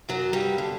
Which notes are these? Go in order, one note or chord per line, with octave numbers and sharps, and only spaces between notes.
F#2 F#3
G2 G3
D3